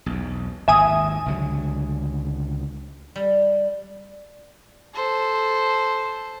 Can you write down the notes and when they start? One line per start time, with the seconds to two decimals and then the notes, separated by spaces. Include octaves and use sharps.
0.06 B1 E2
0.68 G#1 D#2 G#2 E5 G#5 D#6
1.26 C#2 D3 F#3
3.16 G3
4.94 A4 C5